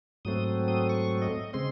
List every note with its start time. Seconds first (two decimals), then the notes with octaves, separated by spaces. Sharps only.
0.25 G#2 F#3 A3 C4 D#6
0.68 D#6
0.90 C#6
1.22 D#5
1.53 C#3 G#3 C4 C6